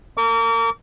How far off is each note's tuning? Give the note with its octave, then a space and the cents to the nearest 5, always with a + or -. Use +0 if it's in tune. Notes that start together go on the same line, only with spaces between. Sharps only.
A#4 -35 D6 -40